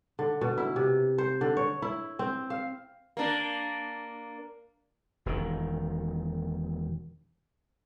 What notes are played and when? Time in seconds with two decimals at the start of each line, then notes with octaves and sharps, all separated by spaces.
0.19 D3
0.41 B2
0.58 E4
0.76 C3
1.18 C5
1.41 D3
1.57 C#5
1.82 E4
2.19 C4
2.50 F5
3.17 A#3 D4
5.26 E1 D#3